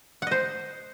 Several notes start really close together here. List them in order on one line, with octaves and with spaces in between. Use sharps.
F#5 D#5 C5